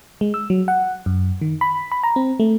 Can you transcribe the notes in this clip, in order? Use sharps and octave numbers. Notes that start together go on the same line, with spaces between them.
G#3
E6
F#3
F#5
F#2
D#3
B5
B5
A#5
C4
A3